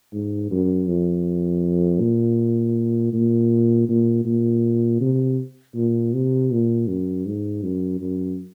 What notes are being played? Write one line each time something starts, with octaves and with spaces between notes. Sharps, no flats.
G#2
F#2
F2
A#2
A#2
A#2
A#2
C3
A#2
C3
A#2
F#2
G#2
F#2
F#2